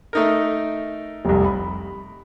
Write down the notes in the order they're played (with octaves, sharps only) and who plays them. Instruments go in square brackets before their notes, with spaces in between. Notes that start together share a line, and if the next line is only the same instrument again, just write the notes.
[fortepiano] A3 D#4 A#4
[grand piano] F1 C2
B5